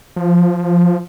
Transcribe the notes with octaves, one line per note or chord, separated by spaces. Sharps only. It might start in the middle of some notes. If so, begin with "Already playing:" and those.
F3